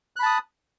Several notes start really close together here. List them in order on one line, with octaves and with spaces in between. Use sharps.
F#6 B5 A5 D#6